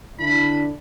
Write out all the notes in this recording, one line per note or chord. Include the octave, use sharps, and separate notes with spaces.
D3 D4 E4 B5